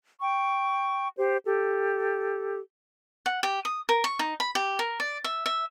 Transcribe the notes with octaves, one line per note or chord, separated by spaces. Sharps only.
G5 C#6
G4 C5
G4 A4
F#5
G4
D#6
A#4
C#6
D#4
B5
G4
A#4
D5
E5
E5